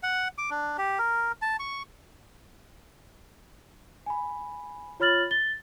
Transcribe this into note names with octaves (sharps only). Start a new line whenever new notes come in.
F#5
D6
D4
G4
A#4
A5
C#6
G#5 B5
F4 C#5 B5 F6 A6 F#7
A6 G7